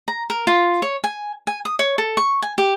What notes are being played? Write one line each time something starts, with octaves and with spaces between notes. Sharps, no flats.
A#5
A#4
F4
C#5
G#5
G#5
D#6
C#5
A4
C#6
G#5
G4